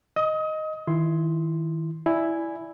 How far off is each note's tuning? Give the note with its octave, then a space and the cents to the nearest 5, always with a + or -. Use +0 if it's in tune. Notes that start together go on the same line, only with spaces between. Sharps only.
D#5 +0 D#6 +30
D#3 +30 E4 +20 C6 +0
E4 +0 D5 +0 G#5 +0